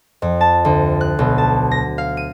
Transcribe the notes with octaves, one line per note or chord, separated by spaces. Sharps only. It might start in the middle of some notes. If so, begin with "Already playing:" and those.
F2
A5
D2
F#6
B1
A5
A#6
F5
D#7